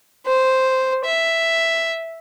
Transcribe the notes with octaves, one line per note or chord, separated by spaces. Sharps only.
C5
E5